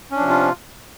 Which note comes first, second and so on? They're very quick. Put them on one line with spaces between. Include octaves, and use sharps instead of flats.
C#4 D4 F3 C3 F4